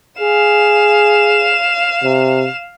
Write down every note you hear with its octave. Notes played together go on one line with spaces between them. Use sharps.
G#4 F5 E7
C3